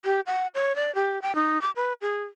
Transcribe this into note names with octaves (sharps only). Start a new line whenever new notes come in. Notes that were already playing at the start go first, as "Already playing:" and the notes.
G4
F#5
C#5
D5
G4
G5
D#4
D6
B4
G#4